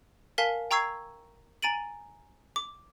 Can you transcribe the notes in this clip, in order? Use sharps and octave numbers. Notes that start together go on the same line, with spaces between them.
A#4 F5 G#5 A5 B6 G7
G5 A#5 C#6 E6 G#6 C7
G#5 A#5 A6 D7 D#7 F#7
D6